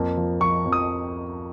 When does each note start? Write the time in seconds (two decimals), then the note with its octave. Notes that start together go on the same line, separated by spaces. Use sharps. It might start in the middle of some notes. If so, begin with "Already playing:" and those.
Already playing: F2 A#3
0.17 F3
0.40 F3 C#6
0.65 F2
0.72 D#6